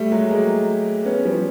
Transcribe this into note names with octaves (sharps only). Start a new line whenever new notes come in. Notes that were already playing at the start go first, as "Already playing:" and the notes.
Already playing: G3 A3
F#3 G#3
G#3 A#3
B3 C#4
F3 G3